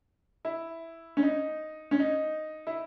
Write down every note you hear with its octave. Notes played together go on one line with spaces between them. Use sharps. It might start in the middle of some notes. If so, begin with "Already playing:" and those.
E4
C#4
D#4
C#4
D#4
E4